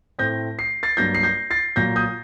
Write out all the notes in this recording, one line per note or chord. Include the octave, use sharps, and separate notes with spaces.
A2 A3 C4 G6 A#6
C7
A6 C7
G2 F#3 A#3 G6 A#6
C7
G6 A#6
A6 C7
A#2 F#3 A#3 G6 A#6
D#6 G6